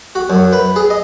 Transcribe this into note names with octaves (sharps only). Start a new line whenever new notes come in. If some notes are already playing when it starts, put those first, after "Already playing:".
F#4
F#2
B4
G#4
D#5